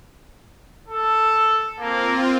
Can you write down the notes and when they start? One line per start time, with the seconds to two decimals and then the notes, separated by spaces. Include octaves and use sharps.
0.88 A4
1.79 A#3 C4 F4